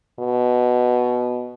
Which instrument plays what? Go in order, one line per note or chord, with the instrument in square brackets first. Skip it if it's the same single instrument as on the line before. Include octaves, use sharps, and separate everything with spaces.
[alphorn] B2